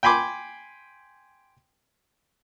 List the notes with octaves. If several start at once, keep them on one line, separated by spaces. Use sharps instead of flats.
G5 G#5 B5 C6 D6